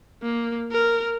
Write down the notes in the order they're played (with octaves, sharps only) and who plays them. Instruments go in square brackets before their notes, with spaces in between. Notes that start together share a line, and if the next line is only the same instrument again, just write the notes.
[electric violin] A#3
A#4